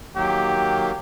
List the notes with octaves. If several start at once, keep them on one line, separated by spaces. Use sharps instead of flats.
D#3 F#3 A#3 G4